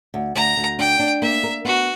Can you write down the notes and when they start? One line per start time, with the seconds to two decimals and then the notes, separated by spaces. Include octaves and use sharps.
0.14 D2
0.35 D2 A#5
0.57 D2
0.79 D4 G5
0.99 D4
1.22 A#3 E5
1.43 A#4
1.65 B3 F#4